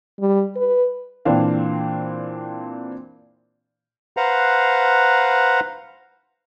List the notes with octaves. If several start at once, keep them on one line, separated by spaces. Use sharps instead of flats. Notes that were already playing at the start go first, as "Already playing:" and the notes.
G3
B4
A#2 E3 C4 D4 F5
B4 C5 F5 F#5 A#5